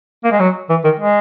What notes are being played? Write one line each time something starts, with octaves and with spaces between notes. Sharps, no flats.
A#3
G#3
F#3
E3
D#3
G#3